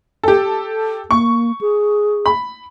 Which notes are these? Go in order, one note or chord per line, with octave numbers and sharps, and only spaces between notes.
G4 A4
A#3 C#6
G#4
B5